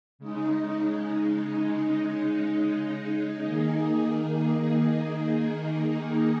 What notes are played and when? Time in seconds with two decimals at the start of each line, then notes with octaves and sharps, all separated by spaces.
0.19 C#3 G#3 D#4
3.42 D#3 A#3 D#4 G#4